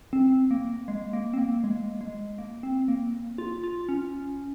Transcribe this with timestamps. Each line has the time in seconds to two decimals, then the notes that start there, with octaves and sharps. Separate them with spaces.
0.13 C4
0.51 A#3
0.88 G#3
1.13 A#3
1.34 C4
1.38 A#3
1.64 G#3
2.01 G#3
2.38 A#3
2.63 C4
2.88 A#3
3.38 F4
3.64 F4
3.89 C#4